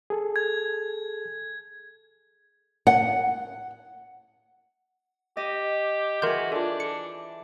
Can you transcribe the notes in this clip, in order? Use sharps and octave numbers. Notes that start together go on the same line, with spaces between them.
G#4 A4
G#6
F#5
G4 D#5
E3 F#4 G#4 A#4 C6 G6
D4 F4 A4
C#7